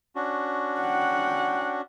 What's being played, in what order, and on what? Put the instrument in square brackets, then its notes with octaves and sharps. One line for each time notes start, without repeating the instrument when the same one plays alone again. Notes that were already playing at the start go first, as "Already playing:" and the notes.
[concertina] C#4 D4 F#4
[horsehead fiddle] F#5 G5